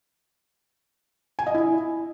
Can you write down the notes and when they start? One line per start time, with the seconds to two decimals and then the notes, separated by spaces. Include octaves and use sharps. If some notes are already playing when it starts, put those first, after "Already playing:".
1.39 G#5
1.47 D#5
1.54 E4